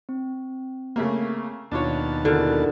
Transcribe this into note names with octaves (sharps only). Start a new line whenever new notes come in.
C4
C#3 A3 A#3
D#2 B2 D4 F4 C#5 A5
D3 E4 F#4 G#4 A#4 F6